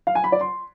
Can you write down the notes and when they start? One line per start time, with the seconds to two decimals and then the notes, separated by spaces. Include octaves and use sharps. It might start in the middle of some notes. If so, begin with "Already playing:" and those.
0.07 F5
0.15 G#5
0.24 B5
0.32 D5
0.41 C6